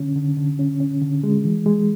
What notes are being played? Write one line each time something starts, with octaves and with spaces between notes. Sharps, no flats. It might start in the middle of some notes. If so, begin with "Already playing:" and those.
Already playing: D3 C#4
D3
D3
C#4
C#4
D3
G#3
E3
G#3